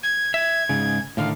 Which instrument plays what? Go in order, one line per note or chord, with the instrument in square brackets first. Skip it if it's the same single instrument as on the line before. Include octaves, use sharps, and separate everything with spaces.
[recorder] G#6
[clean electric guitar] E5 [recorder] G#6
[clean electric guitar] G#2 C#3
[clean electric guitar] A2 D3 D#3 [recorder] F5